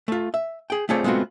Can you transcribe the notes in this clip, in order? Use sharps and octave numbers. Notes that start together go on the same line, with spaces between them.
A3 F4
E5
G#4 G5
A3 C4 F4 G#4 C#5 D5
G#3 A3 B3 C4 F4 F#4